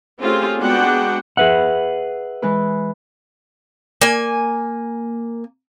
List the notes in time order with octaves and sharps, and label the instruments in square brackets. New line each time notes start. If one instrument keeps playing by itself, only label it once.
[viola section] A3 C4 C#4 F4 G4 G#4
G#3 B3 D4 F#4 F#5 G5
[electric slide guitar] G#4 B4 F#5 [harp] E5
[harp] E3 G#3 B4
[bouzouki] A#3 G#5